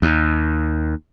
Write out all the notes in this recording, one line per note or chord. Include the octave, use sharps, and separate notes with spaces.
D#2